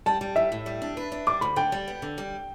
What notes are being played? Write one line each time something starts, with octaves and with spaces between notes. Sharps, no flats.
G3 A5
G3
A2 E5
A2
G3
D4
B4
D4
G3 D6
D2 B5
D3 G5
G3
B3
D3
G3